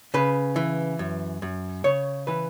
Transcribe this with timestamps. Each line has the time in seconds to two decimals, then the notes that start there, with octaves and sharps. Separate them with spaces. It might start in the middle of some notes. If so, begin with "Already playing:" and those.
0.14 C#3 B4
0.56 E3
0.99 F#2
1.42 F#2
1.84 C#3 C#5
2.27 E3 B4